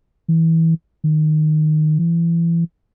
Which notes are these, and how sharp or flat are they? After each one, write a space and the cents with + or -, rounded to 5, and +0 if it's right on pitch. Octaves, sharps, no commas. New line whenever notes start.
E3 -20
D#3 -15
E3 +30